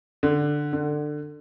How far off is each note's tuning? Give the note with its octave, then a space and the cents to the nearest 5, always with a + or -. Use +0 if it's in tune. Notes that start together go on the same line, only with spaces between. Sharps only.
D3 +5
D3 +20